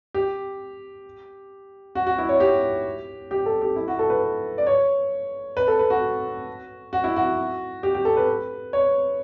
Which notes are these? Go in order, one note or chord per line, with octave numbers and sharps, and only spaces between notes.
G4
F#4
F#4
E4
C#5
G4
G4
A4
G4
E4
F#4
A4
B4
D5
C#5
B4
A4
B4
F#4
F#4
E4
F#4
G4
G4
A4
B4
C#5